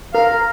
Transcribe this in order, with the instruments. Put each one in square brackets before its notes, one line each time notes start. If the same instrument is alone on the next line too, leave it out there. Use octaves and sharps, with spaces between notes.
[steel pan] A#4 [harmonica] F5